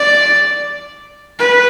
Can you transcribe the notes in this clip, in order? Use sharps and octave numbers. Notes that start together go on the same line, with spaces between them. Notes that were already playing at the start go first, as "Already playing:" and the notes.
Already playing: D5
B4